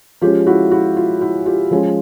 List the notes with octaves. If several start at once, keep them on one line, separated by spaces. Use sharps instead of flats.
F3 G#3 C#4 F4 G4
E4 F#4
E4 F#4
F4
E4 F#4
F4 G4
F3 G#3 C#4